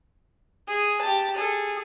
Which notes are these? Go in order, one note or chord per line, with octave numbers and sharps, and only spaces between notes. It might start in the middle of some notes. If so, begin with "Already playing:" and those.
G#4
G4 A5
G#4 A4